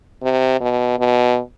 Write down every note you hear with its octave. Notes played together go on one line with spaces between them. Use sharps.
C3
B2
B2